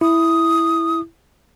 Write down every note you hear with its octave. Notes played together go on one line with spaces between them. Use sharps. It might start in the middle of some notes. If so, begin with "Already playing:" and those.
E4 D#6